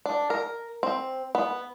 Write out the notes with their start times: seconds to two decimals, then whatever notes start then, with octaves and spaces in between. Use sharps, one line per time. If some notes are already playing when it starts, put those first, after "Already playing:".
0.06 D4
0.30 A#4
0.83 C4
1.35 B3